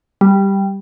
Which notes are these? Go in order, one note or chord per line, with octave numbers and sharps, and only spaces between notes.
G3